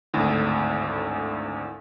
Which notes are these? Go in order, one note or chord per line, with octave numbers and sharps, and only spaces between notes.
G#1 D2 A2